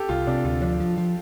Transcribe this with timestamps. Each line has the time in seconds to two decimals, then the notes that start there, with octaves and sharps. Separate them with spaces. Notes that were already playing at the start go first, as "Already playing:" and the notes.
Already playing: G4 A4
0.09 C2 F4
0.27 C3 D4
0.45 D2 F4
0.62 F3 D4
0.80 F3
0.98 F3